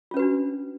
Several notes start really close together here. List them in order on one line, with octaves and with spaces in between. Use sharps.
F4 C#4 B4 F#4 D4